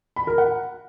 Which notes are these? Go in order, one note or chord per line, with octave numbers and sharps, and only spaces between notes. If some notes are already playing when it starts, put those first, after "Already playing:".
B5
A#4
F#5